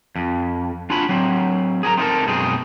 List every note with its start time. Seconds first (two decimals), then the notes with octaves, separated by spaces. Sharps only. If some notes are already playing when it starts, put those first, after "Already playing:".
0.16 F2
0.90 D4 F4 F#4 G#5 B5
1.09 F#3 C4
1.83 G#4 A#4 G#5 A#5
1.97 C4 D#4 F4 A4 A#4 A5
2.27 F#2 B2 G#3 C4 G#4